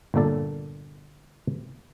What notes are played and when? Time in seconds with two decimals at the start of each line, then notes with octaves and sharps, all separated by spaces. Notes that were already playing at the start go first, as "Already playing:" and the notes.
0.14 G1 A#2 A#3 A4 D5